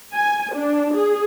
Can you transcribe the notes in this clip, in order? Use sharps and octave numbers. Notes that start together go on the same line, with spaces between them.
G#5
D4
G#4